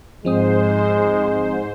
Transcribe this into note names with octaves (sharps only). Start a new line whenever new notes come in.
G#2 F3 G#3 C4 C5 D#6